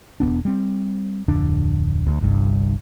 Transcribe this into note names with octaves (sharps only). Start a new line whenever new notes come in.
E1 F2 B3 D4
G3 C4
D1 F2 D3 D4
D2
G1 C2 G2